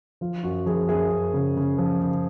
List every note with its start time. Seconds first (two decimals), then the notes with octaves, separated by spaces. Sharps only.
0.21 F3 F4
0.43 F#2 F#4
0.66 F3 G#4
0.89 F#2 G#4
1.11 F#2
1.34 C#3
1.57 C#3
1.78 F3
2.01 C#3